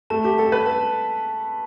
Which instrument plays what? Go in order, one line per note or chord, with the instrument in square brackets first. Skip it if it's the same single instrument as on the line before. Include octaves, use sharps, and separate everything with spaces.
[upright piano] A3 [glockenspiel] A5
[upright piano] G4
[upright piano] A4 [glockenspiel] A5
[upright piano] B4
[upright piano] A4 [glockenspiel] A5